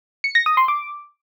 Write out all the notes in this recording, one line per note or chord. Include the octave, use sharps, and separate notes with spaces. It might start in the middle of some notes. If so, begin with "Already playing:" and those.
C#7
A#6
D#6
C6
D6